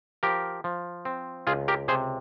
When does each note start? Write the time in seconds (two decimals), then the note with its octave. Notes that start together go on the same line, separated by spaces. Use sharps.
0.23 F3 G4 A#4
0.64 F3
1.05 C4
1.47 C#2 F4 G#4
1.68 G4 A#4
1.88 C3 G#4 C5